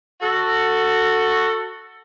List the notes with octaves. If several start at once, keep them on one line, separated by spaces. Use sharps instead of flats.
F#4 A4